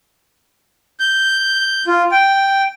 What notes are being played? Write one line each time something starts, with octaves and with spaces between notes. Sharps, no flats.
G6
F4
G5